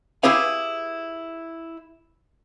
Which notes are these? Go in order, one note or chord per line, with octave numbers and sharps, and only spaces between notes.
E4 G4 G#4 B4 F5